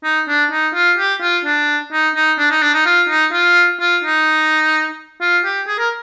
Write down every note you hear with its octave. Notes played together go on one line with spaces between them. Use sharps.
D#4
D4
D#4
F4
G4
F4
D4
D#4
D#4
D4
D#4
D4
D#4
F4
D#4
F4
F4
D#4
F4
G4
G#4
A#4